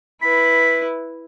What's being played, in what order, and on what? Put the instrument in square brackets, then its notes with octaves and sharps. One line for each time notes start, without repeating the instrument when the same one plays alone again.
[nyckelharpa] E4 B4 [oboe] B5